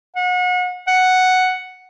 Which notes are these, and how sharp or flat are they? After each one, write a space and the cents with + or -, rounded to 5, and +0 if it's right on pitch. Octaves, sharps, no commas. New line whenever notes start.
F#5 -35
F#5 +0